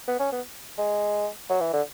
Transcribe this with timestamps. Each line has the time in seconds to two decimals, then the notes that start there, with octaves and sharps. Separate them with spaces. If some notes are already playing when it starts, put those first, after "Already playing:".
0.08 B3
0.20 C#4
0.32 B3
0.78 G#3
1.50 F#3
1.61 E3
1.73 D3